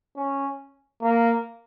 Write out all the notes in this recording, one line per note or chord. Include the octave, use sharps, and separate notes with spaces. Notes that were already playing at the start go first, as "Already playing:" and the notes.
C#4
A#3